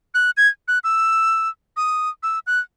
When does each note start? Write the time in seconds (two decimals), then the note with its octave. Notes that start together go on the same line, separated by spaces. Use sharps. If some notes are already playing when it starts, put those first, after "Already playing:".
0.14 F#6
0.37 G#6
0.68 F#6
0.84 E6
1.77 D#6
2.23 E6
2.47 F#6